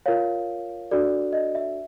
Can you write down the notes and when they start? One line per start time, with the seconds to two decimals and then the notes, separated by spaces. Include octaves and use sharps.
0.06 F4 A#4 C#5 F5
0.91 D4 F#4 A4 D5
1.33 D#5
1.55 E5